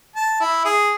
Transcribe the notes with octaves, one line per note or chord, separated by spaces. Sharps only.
A5
E4
G#4